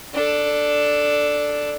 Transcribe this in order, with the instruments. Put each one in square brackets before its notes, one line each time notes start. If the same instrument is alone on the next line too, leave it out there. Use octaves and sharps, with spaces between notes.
[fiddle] D4 A4